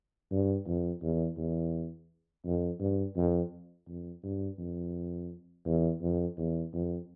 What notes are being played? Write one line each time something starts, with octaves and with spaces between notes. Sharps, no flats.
G2
F2
E2
E2
F2
G2
F2
F2
G2
F2
E2
F2
E2
F2